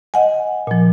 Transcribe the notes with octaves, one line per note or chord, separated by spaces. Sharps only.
D#5 F#5 G#5
A#2 F3